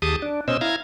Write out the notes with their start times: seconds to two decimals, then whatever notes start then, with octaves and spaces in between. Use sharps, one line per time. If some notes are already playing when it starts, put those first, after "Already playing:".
0.02 D#2 G4 G#4 A5 D#6
0.22 D4
0.48 B2 C#4 C5 D#5 E6
0.61 E4 F5 A#5 G#6